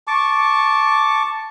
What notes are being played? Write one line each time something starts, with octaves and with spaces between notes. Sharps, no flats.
A5 C#6 D6